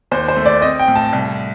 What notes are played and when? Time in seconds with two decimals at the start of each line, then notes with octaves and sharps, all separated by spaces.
0.11 D#2 C5
0.28 C5
0.36 A3
0.46 D5
0.61 C4 D#5
0.79 G5
0.88 A2
0.95 A5
1.13 C2